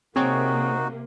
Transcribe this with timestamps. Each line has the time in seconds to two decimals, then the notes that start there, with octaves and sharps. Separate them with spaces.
0.16 C3 A#3 C4 D#4 F#4 G#4 C#5 G5